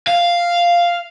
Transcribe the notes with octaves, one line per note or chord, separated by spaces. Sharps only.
F5